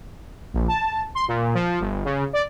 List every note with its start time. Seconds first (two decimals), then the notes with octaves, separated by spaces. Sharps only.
0.54 A#1
0.68 A5
1.15 C6
1.28 A#2
1.54 F3
1.80 G1
2.05 C#3
2.33 D5